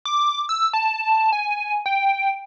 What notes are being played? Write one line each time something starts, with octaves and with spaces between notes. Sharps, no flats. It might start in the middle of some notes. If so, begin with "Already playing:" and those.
D6
E6
A5
G#5
G5